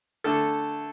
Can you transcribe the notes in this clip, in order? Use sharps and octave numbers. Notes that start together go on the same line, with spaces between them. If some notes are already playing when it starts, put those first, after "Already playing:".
D3 A3 A4